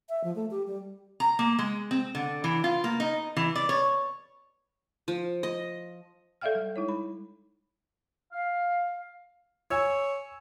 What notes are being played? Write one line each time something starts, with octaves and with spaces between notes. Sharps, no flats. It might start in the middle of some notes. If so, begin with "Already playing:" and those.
E5
F3
A3
G4
G3
A#5
A#3
G#3
C4
D3
E3
F4
A#3
D#4
E3
D5
C#5
F3
D#5
A4 D5 E5 F5 G5 F6
G3
G#3 D#4 E4 C#5
B5
F5
C#5 G#5 E6 G#6